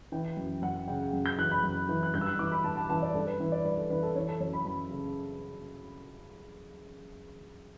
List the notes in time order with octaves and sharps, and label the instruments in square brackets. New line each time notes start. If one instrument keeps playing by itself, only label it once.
[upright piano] E3 G5
F#2
F#2 F#5
C#3 G5
F#2
G6
E3 F#6
B5
F#2
E3
F#6
G2 G6
E6
F#6
E3 D6
B5
G2 A5
A5
E3 A5
D5
G2 A4
B4
E3
D5
G2 B4
A4
E3 B4
A4
E3 C#5
A4
F#2 C#5
B5
F#2 B5
C#3